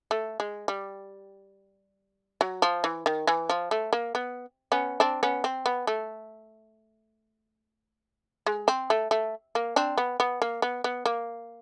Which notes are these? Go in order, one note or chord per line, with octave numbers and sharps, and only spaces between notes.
A3
G#3
G3
F#3
F3
E3
D#3
E3
F3
A3
A#3
B3
B3 C#4
C4 D4
B3 C#4
C4
B3
A3
G#3
C4
A3
A3
A#3
C4 D4
B3
B3
A#3
B3
B3
A#3